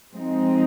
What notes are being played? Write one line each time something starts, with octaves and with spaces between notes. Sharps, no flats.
F3 G#3 C4 D#4